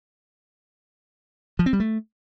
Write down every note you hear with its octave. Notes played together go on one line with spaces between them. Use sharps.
F3
C4
G3
A3